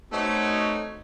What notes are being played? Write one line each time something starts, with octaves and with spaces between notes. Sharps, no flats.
A3 B3 C4 D#4 F#4 C#5